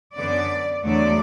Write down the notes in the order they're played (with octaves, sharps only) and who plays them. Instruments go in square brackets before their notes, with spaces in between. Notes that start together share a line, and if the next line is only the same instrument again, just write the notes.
[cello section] F#2 D3 B3 D5
E2 D3 F#3 A3 D5